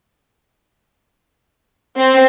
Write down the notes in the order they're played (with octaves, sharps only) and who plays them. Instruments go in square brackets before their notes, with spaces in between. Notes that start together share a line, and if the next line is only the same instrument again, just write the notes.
[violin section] C4